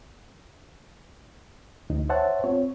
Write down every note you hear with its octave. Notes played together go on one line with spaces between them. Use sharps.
D2 D#4
C5 C#5 E5 F#5 A5
C4 F4 C#5